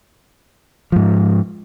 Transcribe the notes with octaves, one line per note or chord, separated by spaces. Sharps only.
G#2 F3